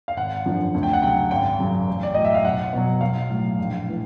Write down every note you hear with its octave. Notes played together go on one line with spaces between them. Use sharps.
F5
G#1 F#5
F#2 D3 F3
D2
G5
F#5
C#3 F#3 G5
G#1 G5
F#2 C#3 F#3
A1
D5
A2 F#3 D#5
E5
F5
B1 F#5
B2 F#3
B1 F5
A2 F#3
A#1
A2 E3